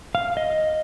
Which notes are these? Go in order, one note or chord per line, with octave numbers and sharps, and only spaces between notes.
F5
D#5